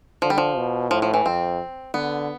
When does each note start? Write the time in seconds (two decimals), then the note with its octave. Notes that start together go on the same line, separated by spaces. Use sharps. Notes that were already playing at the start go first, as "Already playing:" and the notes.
0.22 D3 F3
0.30 G3
0.38 F3
0.57 B2
0.91 A2 F3
1.02 F3
1.14 E3
1.25 F2 C4
1.94 D3 B3